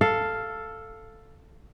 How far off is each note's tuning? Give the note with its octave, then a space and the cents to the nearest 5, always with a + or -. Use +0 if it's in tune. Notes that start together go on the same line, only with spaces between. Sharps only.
A4 +5 F5 +0